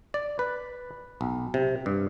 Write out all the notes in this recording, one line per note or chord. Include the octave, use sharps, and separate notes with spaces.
D5
B4
B1
C3
G2